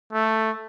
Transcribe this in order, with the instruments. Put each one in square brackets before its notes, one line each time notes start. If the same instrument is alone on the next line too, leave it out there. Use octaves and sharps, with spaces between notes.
[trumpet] A3